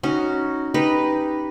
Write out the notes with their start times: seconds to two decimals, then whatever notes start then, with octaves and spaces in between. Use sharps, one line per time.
0.03 C#4 D#4 F#4
0.74 D#4 G4 B4